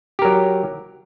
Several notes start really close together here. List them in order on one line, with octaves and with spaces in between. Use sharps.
G4 A#4 F#3